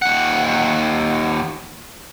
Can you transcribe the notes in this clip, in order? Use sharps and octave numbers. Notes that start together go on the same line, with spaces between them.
D#2 F#5